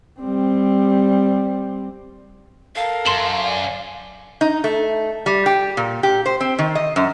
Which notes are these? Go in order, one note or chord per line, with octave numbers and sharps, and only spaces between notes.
G3 C4
A4 A#4 F5
F#2 C6 E7 F#7
D5 G#5
D#4
A3
G3
G4
A#2
G4
C5
C4
D#3
D#5
F#2